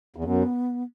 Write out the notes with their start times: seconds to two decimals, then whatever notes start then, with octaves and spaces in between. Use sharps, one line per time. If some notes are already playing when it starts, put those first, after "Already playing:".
0.16 E2
0.24 F#2 B3